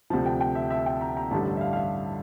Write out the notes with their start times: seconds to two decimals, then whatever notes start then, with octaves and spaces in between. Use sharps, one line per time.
0.10 D2 C3 F3 A5
0.26 G5
0.41 G5
0.55 E5
0.70 E5
0.86 G5
1.01 A#5
1.17 A#5
1.31 A1 G2 D3 G3 A5
1.57 E5
1.61 F5
1.73 F5
1.76 E5